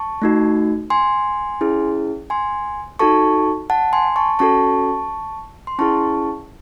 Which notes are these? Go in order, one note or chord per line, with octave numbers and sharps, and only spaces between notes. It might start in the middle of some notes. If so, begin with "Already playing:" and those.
Already playing: A5 C#6
A3 D#4 F#4
G#5 C6
C#4 E4 G#4
G#5 C6
D#4 F#4 A4 A5 C#6
F#5 A5
G#5 C6
A5 C#6
C#4 F#4 A4 A5 C#6
C6
C#4 E4 G#4 A5 C#6